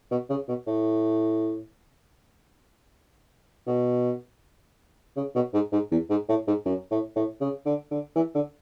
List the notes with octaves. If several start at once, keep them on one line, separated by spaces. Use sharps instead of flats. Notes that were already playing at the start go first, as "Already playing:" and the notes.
B2
C#3
B2
A2
B2
C#3
B2
G#2
G#2
E2
G#2
A2
G#2
F#2
A2
A2
C#3
D3
D3
E3
D3